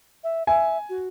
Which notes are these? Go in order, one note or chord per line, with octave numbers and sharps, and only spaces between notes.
E5
E5 G#5
F#4